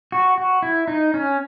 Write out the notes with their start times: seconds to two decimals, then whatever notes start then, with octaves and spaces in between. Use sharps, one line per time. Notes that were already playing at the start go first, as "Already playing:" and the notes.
0.12 F#4
0.38 F#4
0.63 E4
0.88 D#4
1.14 C#4